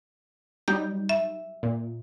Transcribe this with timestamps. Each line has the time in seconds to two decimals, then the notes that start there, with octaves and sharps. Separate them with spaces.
0.68 F#3 G3 D#4 G6
1.09 E5
1.63 A#2